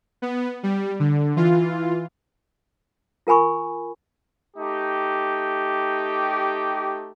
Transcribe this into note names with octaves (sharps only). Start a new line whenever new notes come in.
B3
G3
D3
E3 F4
F4 A#4 G#5 B5 C#6
A3 D#4 G4